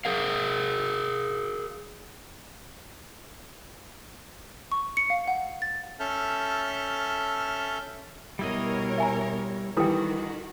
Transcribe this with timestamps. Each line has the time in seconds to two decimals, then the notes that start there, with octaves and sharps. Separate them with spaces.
0.05 G#4 A#4 F5
4.72 C#6
4.97 C#7
5.10 F5
5.28 F#5
5.62 A6
6.00 C#4 A4 E5 A5 F6 G6
8.39 B2 G3 E4 A#4 C#5 D#5
8.98 E5 G#5 A#5
9.77 D#3 E3 G3 F#4 A4 G5 D#6